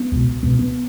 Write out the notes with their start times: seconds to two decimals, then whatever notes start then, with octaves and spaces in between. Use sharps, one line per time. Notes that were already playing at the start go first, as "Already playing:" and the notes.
Already playing: B3
0.12 C#2 B2
0.43 C#2 B2 B3
0.59 B3